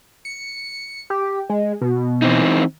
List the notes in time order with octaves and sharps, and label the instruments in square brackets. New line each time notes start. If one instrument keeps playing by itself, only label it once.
[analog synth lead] C#7
G4
G#3
B2
[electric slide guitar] E3 C4 D#4